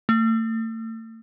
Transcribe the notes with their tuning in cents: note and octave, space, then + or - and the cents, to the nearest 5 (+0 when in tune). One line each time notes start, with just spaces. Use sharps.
A3 +40